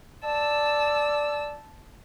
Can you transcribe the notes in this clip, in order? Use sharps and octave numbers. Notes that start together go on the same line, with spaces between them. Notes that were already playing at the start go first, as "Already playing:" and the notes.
D5 A5 E6